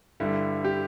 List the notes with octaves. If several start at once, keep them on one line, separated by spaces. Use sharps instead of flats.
G2 D3 G3 E4
G4